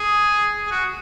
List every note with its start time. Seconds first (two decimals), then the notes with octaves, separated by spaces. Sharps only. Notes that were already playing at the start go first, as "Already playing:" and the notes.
Already playing: G#4
0.67 G#4
0.71 F#4